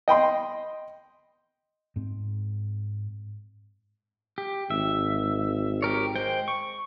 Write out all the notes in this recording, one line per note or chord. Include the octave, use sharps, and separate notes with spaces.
D#5 G5 B5 C6
G#2 C4
G4
G#1 E5
G4 A#4 C#5
G#3 C5 G5
C#6